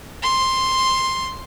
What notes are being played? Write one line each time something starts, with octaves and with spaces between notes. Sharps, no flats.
C6